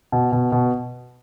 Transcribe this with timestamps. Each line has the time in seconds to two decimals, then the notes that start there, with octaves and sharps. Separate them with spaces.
0.12 B2
0.32 B2
0.52 B2